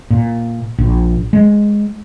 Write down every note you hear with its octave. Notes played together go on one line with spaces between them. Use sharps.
A#2
A#1
G#3